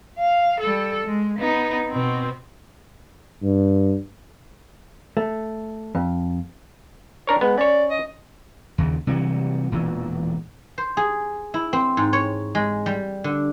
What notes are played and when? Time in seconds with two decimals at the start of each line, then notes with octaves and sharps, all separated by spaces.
0.18 F5
0.60 G3 A4
1.06 G#3
1.38 B3 D#4
1.89 B2 C4
3.42 G2
5.17 A3
5.95 F2
7.27 D4 A#4 C#5
7.41 G#3 B3
7.58 C#4 C#5 D5
7.90 D#5
8.78 D#2 C#3
9.07 C3 E3 F#3 G3
9.72 E1 A#2 E3
10.78 C5
10.97 G#4
11.54 E4
11.73 C4
11.97 G#2
12.13 C#5
12.55 G#3
12.86 G3
13.24 D3